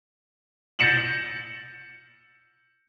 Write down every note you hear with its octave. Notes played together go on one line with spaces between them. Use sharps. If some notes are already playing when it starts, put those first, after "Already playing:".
G6 A6 A#6 C#7 E7 F#7